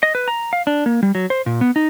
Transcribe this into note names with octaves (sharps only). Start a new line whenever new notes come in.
D#5
B4
A#5
F5
D4
A#3
G3
F#3
C5
A#2
B3
D#4